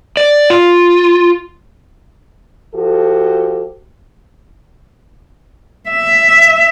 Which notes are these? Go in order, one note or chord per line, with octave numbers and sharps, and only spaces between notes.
D5
F4
F3 F#4 G4 A4
E5